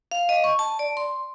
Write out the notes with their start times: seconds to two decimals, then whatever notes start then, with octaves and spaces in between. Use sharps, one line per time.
0.11 F5
0.29 D#5
0.44 C#6
0.59 A5
0.79 D5
0.97 C6